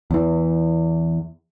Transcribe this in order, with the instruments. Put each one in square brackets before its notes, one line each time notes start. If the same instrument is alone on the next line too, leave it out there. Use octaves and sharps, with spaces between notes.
[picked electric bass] E2 E3